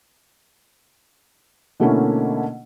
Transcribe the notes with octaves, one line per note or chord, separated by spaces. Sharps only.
B2 D3 A3 A#3 C#4 E4